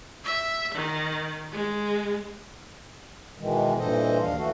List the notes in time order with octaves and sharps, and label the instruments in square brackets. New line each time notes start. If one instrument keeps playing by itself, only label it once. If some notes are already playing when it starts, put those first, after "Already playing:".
[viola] E5
D#3
G#3
[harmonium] B2 D#3 E3 G#3
G2 A#2 E3 A4 C5 D#5
D#2 D4 F5
E3 A3 F#4 A4